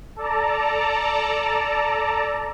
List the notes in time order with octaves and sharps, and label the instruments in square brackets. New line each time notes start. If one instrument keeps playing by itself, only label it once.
[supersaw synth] A4 D5 A5 A#5